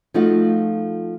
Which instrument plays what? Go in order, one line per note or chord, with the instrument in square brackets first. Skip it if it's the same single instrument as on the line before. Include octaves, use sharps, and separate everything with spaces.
[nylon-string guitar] F3 A3 D#4 F4 F#4